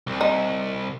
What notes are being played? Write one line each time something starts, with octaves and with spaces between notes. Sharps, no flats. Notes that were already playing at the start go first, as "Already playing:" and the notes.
C2
D#4